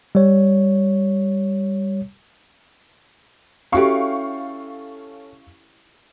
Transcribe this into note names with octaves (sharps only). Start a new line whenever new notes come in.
G3 C#5
C#4 E4 F#4 G4 A4 F5 C#6